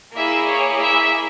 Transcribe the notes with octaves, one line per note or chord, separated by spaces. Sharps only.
A#3 E4 G#4 E5
C#5
E5